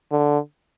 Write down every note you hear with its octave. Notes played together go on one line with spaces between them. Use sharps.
D3